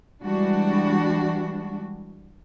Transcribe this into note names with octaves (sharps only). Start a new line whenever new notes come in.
E3 G3 G#3 D4 F#4